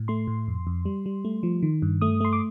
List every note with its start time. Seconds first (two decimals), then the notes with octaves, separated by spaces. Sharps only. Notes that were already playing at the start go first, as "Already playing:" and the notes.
Already playing: A2
0.08 A3 C6
0.27 A2
0.48 F2
0.67 F2
0.85 G3
1.06 G3
1.25 A3
1.43 F3
1.63 D#3
1.82 G2
2.01 A3 D#6
2.21 A3 C6
2.33 D6